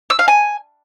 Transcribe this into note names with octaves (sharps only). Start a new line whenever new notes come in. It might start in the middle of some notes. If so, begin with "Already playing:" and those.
E6
F5
G#5